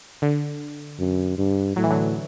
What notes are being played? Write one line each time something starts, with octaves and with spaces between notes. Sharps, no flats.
D3
F#2
G2
A2 F#3
E3
D3 F#3